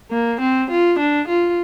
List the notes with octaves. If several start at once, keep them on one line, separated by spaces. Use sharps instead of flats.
A#3
C4
F4
D4
F4